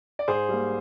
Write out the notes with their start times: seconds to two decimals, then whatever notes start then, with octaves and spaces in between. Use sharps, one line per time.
0.19 D5
0.28 G#2 G#4 C5
0.49 G3 A#3